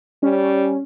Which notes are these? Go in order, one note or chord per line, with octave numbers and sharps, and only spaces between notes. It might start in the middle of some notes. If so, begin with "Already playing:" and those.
G3 C#4